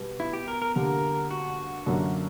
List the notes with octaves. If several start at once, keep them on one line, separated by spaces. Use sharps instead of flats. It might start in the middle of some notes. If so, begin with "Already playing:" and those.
Already playing: B2 G3 B3
E4
G4
A#4
A#4
D3 G3 A#3 A#4
F#4
F#2 D3 F#3 A#3 D4